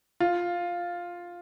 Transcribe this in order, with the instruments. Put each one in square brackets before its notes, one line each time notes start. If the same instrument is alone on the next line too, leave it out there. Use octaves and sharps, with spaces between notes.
[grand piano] F4